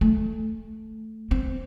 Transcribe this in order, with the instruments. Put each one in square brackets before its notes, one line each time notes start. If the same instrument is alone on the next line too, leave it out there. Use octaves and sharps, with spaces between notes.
[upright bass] A3
C4